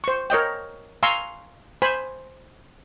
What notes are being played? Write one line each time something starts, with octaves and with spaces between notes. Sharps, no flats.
C5 C#6
A#4 C#5 D#5 G5
F5 G#5 A#5 C6 C#6 E6
C5 G#5 B5